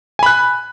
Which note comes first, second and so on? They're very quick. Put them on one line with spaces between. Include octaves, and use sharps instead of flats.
G#5 B5 F#6